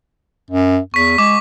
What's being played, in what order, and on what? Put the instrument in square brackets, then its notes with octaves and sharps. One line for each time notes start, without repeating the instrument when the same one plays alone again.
[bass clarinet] F#2
[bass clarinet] E2 [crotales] C#6 B6
[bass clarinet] G#3 [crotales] D6